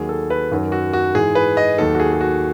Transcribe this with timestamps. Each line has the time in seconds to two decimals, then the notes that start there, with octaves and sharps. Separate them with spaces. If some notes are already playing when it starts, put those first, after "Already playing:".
Already playing: D#2 D#3 F#3 G#4
0.09 A4
0.30 B4
0.52 F#2 D#3 F#3
0.72 F#4
0.93 F#4
1.15 G#2 E3 G#4
1.35 B4
1.57 D#5
1.78 D#2 D#3 F#3 A4
1.94 F#4
2.00 G#4
2.13 G#4
2.21 F#4